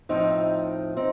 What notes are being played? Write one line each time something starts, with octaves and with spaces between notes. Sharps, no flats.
A2 F3 C4 D#4
C4 D#4